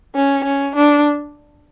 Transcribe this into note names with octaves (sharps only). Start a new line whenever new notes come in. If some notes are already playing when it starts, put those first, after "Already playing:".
C#4
C#4
D4